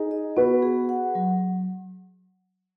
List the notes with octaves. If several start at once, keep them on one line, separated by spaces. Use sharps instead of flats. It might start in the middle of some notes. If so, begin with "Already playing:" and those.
Already playing: D#4 G#4
D#5
B3 F#4 B4
G#4
F#5
F#3